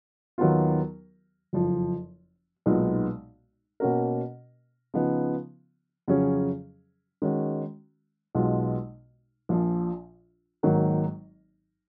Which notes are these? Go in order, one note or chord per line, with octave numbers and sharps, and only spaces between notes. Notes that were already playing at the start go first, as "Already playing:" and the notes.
D#2 D#3 F#3 B3 F4
F#1 F2 F3
B1 A#2 G#3 B3 D#4
B2 A#3 C#4 F#4 A#4
C#3 F3 B3 D#4
F2 C#3 F#3 C#4 G#4
D#3 G#3 C#4 F#4
B1 B2 G#3 B3 F4
A#1 A#2 F3
G#1 G#2 D#3 F#3 A#3